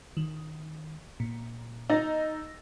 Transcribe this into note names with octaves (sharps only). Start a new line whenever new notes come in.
D#3
A#2
D#4 E6 A6 A#6